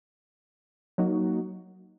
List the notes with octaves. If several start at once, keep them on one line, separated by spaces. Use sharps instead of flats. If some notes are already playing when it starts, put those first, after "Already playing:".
F#3 A#3 D#4 F#4